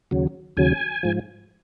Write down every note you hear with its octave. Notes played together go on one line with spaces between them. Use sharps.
D#2 C#3 F#3
D#2 C#3 F#3 G#5
G#2 F3